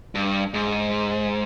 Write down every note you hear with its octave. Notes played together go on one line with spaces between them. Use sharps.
G2
G#2